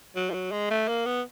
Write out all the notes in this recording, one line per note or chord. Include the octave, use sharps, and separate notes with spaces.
F#3
F3
F#3
G#3
A3
A#3
B3